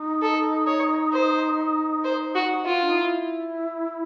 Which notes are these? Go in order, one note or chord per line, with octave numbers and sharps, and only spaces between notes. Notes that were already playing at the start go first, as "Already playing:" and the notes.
Already playing: D#4
A4
C#5
C5
C5
F#4
F4
D4
D#4
E4